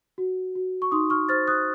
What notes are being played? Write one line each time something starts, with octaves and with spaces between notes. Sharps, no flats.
F#4
F#4
C#6
D#4 C6 D#6
C#6 F6
C5 F6 A6
D#6 F#6